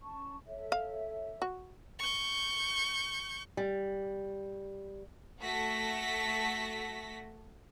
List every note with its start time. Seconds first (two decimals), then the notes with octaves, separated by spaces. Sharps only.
0.01 C#4 A5 C#6
0.46 A4 C#5 E5
0.72 F5
1.42 F#4
1.99 C#6 G6
3.57 G3
5.40 A3 F#4 A4 A#6 B6